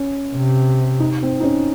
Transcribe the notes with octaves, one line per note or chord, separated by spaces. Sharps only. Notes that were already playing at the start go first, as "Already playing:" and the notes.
Already playing: C#4
C3
D#4
C4
D#4
C#4